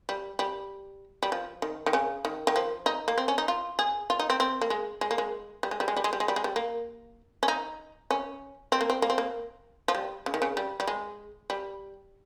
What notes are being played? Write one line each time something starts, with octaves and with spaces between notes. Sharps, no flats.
G3
G3
G3
F3
D#3
D#3
C#3
D#3
D#3
F3
D#4
A#3
C4
C#4
D#4
F4
G#4
F4
D#4
C4
C4
A#3
G#3
G#3
A#3
G#3
G3
G#3
G3
G#3
G3
G#3
G3
G#3
G3
G#3
G3
A#3
C#4
D#4
C#4
C4
A#3
C4
A#3
C4
A#3
F3
G3
C#3
D#3
C#3
G3
G3
G#3
G3